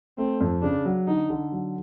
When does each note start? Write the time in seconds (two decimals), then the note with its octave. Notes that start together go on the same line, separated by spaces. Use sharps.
0.18 A3 C4
0.41 F2
0.62 C#3 D4
0.85 F#3
1.08 D3 D#4
1.30 D3
1.52 F#3